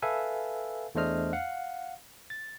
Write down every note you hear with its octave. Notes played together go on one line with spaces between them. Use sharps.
A4 B4 E5 F5 G#5
E2 A3 D4 C5 D#5 F6
F5 F#5
A6